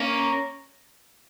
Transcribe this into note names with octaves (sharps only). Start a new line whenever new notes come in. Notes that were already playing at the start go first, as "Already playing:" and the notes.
Already playing: A#3 C#4